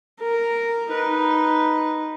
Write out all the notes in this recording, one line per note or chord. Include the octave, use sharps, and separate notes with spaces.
A#4
D#4 B4